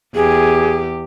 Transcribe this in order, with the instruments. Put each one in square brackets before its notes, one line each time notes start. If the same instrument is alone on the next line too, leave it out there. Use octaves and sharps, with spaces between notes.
[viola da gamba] E2 G4 [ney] G#4